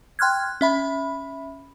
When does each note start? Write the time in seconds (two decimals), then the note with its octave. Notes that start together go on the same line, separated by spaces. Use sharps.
0.19 G5 C6 F6 F#6 G#6
0.61 C#4 E5 B5